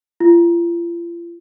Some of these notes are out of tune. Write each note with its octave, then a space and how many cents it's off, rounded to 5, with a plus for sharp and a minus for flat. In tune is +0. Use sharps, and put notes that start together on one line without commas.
F4 -40